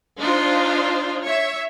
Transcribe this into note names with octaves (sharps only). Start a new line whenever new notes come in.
D4 D#4 F4 C5
C#5 E5